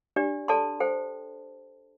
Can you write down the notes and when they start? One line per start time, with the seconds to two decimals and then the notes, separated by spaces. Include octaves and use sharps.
0.16 D4 G4 D5
0.48 A4 D5 A5 C6
0.80 A4 C5 G5